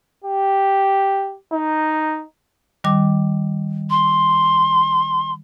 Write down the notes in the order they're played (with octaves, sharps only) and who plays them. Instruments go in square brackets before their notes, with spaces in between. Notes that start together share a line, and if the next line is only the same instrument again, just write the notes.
[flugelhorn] G4
D#4
[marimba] D#3 G3 D6
[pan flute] C6